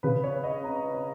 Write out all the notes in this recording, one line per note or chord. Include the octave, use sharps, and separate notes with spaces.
C#3 B4
C#5
C#4
D#5
C#4 A#5
C#4